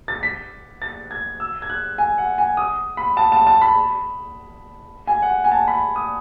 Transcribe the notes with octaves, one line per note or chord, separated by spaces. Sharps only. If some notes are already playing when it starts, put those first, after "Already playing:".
A6
B6
A6
G#6
E6
G#6
F#6
G#5
F#5
G#5
D#6
B5
A5
A5
A5
B5
G#5
F#5
G#5
A5
B5
D#6